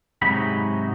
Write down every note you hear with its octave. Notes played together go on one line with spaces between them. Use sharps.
G#2 C3 F#3 D#4 F#4 B5